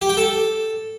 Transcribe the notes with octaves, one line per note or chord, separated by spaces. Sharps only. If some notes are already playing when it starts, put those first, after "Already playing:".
G4
G5
A4